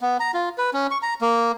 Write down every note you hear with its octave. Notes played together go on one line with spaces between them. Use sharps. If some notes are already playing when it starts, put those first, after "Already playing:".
B3
A#5
F4
B4
C#4
C#6
A#5
A#3